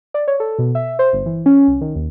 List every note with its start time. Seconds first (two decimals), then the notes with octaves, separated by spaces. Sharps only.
0.14 D5
0.28 C#5
0.40 A4
0.59 B2
0.75 E5
0.99 C5
1.13 G1
1.26 E3
1.46 C#4
1.68 C2
1.81 D#3
1.96 D#2